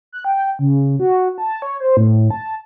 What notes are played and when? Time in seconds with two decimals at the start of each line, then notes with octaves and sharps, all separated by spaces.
0.12 F#6
0.25 G5
0.59 C#3
1.00 F#4
1.38 A5
1.62 C#5
1.80 C5
1.97 A2
2.31 A5